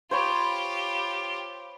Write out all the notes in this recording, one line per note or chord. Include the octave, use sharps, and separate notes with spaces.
F4 G4 C5 C#5 B5